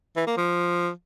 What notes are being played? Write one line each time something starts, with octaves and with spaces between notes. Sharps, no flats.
E3
A#3
F3